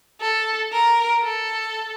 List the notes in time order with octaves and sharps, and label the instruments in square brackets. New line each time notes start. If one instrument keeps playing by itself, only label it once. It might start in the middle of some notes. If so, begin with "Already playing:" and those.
[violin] A4
A#4
A4